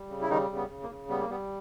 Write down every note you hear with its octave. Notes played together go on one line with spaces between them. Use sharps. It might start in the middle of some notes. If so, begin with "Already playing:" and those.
Already playing: G3
C#3
E4
D#3 G3 D#4
C#3
B3
C#3
A#3
C#3
G3 B3
A#3
G3 B3